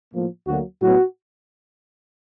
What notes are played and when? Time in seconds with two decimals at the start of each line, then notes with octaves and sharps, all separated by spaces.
0.13 A2 F3 A#3
0.47 D2 D3 F#3 A#3 F#4
0.82 A2 F#3 B3 F#4